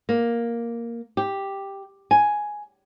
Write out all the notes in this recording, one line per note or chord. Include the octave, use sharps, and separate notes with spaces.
A#3
G4
G#5